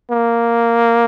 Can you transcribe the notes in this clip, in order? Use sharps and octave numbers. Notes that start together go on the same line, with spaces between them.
A#3